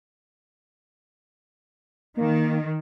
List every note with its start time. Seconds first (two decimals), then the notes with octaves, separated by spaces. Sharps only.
2.17 D#3 A#3